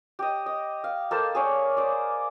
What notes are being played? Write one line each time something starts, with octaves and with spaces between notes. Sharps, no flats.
G4 D#5
D#5
F5
A#3 A4 C5
G#4 C#5 D5
C5 D5